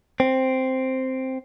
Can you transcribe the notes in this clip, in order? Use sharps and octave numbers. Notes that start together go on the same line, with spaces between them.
C4